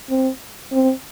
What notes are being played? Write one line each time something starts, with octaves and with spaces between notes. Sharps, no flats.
C4
C4